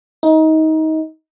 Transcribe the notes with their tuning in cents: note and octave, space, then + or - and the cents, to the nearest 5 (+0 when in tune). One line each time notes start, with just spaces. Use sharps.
D#4 +25